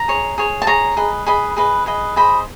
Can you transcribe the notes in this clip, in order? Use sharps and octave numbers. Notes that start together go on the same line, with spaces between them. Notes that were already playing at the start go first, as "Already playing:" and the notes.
Already playing: A#5
G#4 C#5
G#4 C#5
A5
G#4 C#5 A#5
G#4 B4 D#5
G#4 B4 D#5 B5
G#4 B4 D#5
G#4 B4 D#5
G#4 C5 D#5 B5